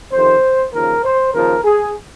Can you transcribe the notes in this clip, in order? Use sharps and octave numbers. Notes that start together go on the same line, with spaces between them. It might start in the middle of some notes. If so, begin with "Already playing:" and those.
F2 C3 D#3 C5
D#2 C#3 F3 A#4
C5
D#2 C#3 F3 A#4
G#4